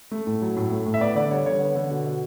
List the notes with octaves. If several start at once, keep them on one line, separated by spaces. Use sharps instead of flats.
A3
A2
F#3
A2
A3
A2
E5
B3 D5
D3 D5
G3 C#5
D3 C#5
B3
D3
B2
B2